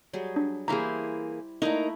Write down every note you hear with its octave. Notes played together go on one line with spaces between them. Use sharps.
F#3 G3 G#4
D4
E3 A#3 E4 G4 G#4 C5 A#5
A3 A#3 D#4 E4 A#4